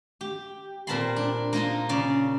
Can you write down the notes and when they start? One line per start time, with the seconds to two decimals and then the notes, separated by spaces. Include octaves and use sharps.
0.21 G4
0.87 A#2 C4 A#4 A5 B5 C6
1.16 D4
1.53 A#3 D#4 F4 A#4
1.89 C#3 D5